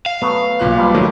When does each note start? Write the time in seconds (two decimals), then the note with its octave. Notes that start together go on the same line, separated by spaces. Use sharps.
0.06 F5
0.22 F#3 A3 B3
0.59 B1 A#2 F#6
0.77 F3 G3 B4
0.94 D#3 F#3 A3